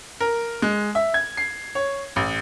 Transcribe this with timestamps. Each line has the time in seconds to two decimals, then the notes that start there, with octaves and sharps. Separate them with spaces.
0.21 A#4
0.62 G#3
0.95 E5
1.14 G#6
1.37 C7
1.75 C#5
2.16 A1